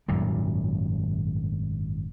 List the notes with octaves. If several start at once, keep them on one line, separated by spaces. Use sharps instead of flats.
G#1 F#2 A#2 G3